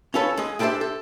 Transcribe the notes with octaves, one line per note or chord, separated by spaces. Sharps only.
C#4 F4 A4 B4 C#5
G#3 G#4
D4 G4 A4 B4 C5 E5
A4